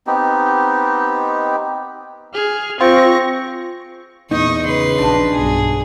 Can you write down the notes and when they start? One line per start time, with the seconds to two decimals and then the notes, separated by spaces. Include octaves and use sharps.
0.07 B3 C4 D#4 G4
2.34 G#4 F6
2.81 C4 F4 C#6 A#6
4.31 E2 A#2 D#4 D#5 C#6
4.66 C#3 B4 C6
4.98 A#1 D4 F#4
5.32 B1 G2 G#4